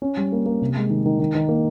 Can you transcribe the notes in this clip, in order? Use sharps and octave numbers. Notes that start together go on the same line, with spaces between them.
C#4
G3
A#3
A#3
C3
G#3
D#3
D#3
D#3
D#3
A#3